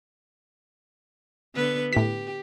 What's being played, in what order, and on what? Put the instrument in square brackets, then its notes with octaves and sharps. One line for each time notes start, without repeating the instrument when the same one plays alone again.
[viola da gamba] D3 B3 B4
[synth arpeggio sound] A2 B6 [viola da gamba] G4